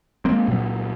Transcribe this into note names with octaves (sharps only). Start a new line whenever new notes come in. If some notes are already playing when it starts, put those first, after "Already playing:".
G#3 A#3 C4
A#2 F#3